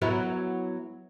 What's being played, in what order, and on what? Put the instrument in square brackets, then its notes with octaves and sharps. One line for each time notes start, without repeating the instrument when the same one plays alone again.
[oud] F#3 B3 E4